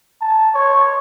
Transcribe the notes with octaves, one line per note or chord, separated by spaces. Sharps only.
A5
C#5